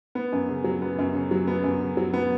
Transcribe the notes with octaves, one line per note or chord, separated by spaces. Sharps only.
B3
F#2
C#3
F#3
B3
F#2
C#3
F#3
B3
F#2
C#3
F#3
B3